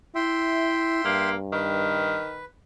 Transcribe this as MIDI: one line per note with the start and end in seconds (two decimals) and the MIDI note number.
0.15 1.04 64
0.15 1.29 76
0.15 1.29 79
0.15 1.29 84
1.05 2.21 43
1.05 1.35 58
1.53 2.43 51
1.53 2.45 71